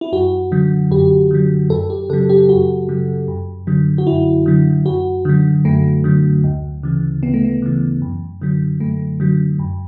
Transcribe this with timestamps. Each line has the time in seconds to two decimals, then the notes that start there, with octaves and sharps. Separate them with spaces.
0.01 E4
0.12 F#2 F#4
0.52 D3 F#3
0.91 F#2 G4
1.31 D3 F#3
1.70 F#2 A4
1.90 G4
2.09 C#3 A4
2.13 F#3
2.29 G4
2.49 F#2 F#4
2.89 C#3 F#3
3.28 F#2
3.67 D3 F#3
3.98 F#4
4.07 F#2 E4
4.46 D3 F#3
4.86 F#2 F#4
5.25 D3 F#3
5.65 F#2 A3
6.04 D3 F#3
6.44 D2
6.83 C#3 E3
7.23 D2 B3
7.34 A3
7.45 B3
7.62 C#3 E3
8.02 F#2
8.41 D3 F#3
8.80 F#2 A3
9.20 D3 F#3
9.59 F#2